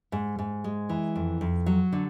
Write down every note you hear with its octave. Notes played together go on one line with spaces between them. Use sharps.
G#2
G#2
G#3
E3
F2
F2
F#3
D3